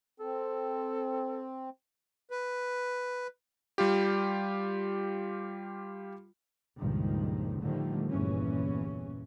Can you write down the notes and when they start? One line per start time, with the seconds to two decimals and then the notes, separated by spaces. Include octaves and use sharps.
0.20 C4 A4
2.30 B4
3.78 G3 F4 G4
6.79 C#2 G2 A#2 D#3 F3
7.61 A2 D3 D#3 F3 G3 A3
8.11 G1 E2 G2 A#2 E3 C#4